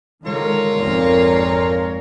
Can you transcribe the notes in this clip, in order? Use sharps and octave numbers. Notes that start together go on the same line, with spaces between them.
D3 D#3 G#3 F4 A#4 C#5
G#1 F2 A#2